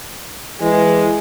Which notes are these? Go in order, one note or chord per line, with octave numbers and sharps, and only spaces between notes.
E3 G#3